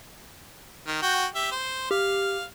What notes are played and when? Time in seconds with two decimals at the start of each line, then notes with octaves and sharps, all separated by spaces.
0.87 D#3
1.02 F#4 G5
1.35 G4 E5
1.52 C5
1.91 G4 F5